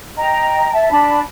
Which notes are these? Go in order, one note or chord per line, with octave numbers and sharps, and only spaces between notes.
D#5 G5 A#5
E5 A5
D4 A5 B5